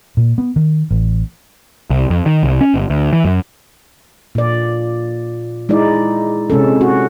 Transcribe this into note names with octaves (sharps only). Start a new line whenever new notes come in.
A#2
B3
D#3
A1
C2
F2
D#3
C2
C#4
G1
D2
E3
F#2
A#2 D5
G#3 D#4 E4 D5
C3 G#3 C#4 A4
F#4